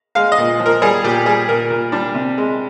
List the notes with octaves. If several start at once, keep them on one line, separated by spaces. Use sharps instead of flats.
G#3 F5
D#5
A#2
F3
A#4
G3 G#4
A#2 G4
G3 G#4
A#2 A#4
A#2
G3 D4
C3
G#3